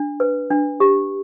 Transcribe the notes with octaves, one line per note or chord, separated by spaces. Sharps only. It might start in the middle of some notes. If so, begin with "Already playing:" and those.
Already playing: D4
B4
D4
G4